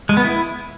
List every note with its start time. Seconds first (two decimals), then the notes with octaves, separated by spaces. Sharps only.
0.09 G#3
0.17 B3
0.25 E4